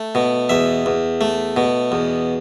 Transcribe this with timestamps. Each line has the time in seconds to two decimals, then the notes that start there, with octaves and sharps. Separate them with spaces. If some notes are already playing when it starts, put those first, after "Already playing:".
Already playing: A3
0.15 B2
0.49 E2 E5
0.86 E2
1.21 A3
1.57 B2
1.92 E2